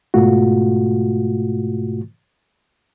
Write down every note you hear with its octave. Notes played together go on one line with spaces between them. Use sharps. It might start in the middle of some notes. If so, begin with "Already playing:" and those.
G#2 B2 A3 F4 F#4